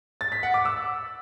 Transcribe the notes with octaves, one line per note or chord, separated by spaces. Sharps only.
A6
B6
F#5
D6
E6